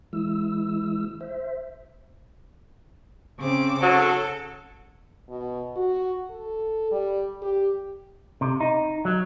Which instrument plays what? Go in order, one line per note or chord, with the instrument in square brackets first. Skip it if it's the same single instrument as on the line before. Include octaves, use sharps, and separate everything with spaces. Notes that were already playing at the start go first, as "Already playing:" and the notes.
[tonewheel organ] E3 G#3 E4 E6
C5 E5
[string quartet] C#3 C4 D6
[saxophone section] G#2 F#3 [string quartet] A4
[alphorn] B2
F#4
A4
G3
G4
[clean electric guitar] C3
D#4
F#3